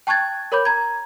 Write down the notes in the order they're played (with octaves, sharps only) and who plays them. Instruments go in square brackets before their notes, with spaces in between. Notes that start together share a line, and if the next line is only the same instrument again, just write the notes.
[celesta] G5 A5 C#6 F#6 G#6 A6
A#4 C#5 B5 D6 G6
A#5 G#6